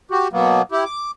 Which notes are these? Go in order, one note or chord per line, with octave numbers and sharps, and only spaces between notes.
F#4 G4
B2 F#3 A#3 B3
E4 G4
D6